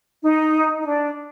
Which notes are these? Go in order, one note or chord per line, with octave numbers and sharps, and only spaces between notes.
D#4
D#4
D4